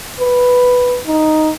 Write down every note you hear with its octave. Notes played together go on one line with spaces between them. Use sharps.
B4
D#4